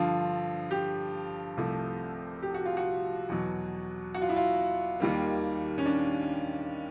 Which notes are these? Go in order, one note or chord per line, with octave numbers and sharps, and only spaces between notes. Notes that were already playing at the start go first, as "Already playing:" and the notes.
Already playing: G2 D3 F3 F4
G4
C2 C3 F3 A3
G4
F#4
F4
F#4
E2 B2 F#3
F#4
F4
E4
F4
D#2 D#3 G3 A#3
C#4
D4